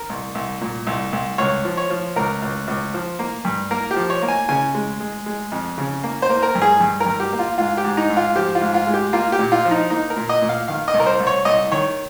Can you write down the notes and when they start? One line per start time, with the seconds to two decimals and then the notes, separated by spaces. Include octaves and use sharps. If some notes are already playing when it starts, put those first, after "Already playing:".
Already playing: A#4
0.10 C2
0.35 C2
0.61 A#2
0.87 C2
1.13 C2
1.38 C#2 C#5
1.65 F3
1.77 C#5
1.90 F3
2.16 C#2 A#4
2.42 C#2
2.68 C#2
2.94 F3
3.19 A#3
3.45 G2
3.71 A#3 A#4
3.91 G4
3.96 F3
4.10 C#5
4.22 A#3
4.28 G#5
4.49 C#3 G#5
4.75 G#3
5.00 G#3
5.26 G#3
5.52 F2
5.78 C#3
6.04 A#3
6.22 C5
6.29 A#3
6.43 A#4
6.55 G2
6.62 G#4
6.81 G2
7.00 A#4
7.06 G2
7.20 G4
7.33 A#3
7.39 F4
7.58 G#2 F4
7.77 G4
7.84 G#2
7.97 D#4
8.10 G#2
8.17 F4
8.36 F3 G4
8.55 F4
8.61 G#2
8.74 F4
8.87 G#3
8.94 G4
9.13 A#3 F4
9.32 G4
9.39 A#2
9.52 F4
9.65 F3
9.71 D#4
9.90 A#3 D#4
10.10 A#4
10.16 A#2
10.29 D#5
10.42 A#2
10.49 F5
10.68 D#3 F5
10.88 D#5
10.94 C2
11.00 A#4
11.06 C5
11.20 C2
11.27 C#5
11.45 C2 D#5
11.71 D#3 C#5